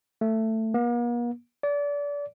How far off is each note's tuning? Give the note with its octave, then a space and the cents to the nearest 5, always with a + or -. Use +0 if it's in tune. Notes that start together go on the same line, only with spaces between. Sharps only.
A3 +15
A#3 +45
D5 -30